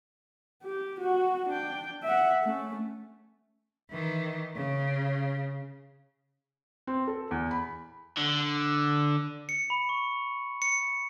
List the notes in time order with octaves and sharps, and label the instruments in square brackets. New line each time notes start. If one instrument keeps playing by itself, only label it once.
[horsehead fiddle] G4
F#4 F#5
D4 G5
E5 F#5
A3 C#4
[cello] D#3 E3
C#3
[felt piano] C4
A4
E2
B5
[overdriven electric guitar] D3
[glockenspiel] C#7
B5
C#6
C#7